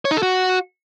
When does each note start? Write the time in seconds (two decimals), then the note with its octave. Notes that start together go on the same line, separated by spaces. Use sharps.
0.05 C#5
0.11 D#4
0.17 A4
0.23 F#4